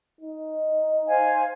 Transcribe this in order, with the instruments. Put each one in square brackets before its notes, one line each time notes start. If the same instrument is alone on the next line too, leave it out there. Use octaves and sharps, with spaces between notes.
[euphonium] D#4
[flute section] C5 F5 G#5